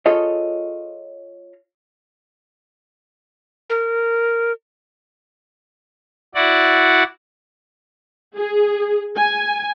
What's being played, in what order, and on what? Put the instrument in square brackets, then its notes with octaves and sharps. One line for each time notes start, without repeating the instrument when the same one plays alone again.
[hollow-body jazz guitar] F4 G#4 A4 C#5 D#5
[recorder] A#4
[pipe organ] E4 F#4 D5 F#5
[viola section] G#4
G#5